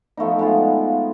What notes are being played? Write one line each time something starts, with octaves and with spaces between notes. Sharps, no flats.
F3 A3 B3 D#4
G#3 B3 F4